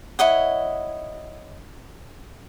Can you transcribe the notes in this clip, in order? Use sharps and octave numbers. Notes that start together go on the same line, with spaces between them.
E4 C#5 D#5 F#5